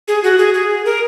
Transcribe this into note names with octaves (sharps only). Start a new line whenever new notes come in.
G#4
F#4
G#4
G#4
A#4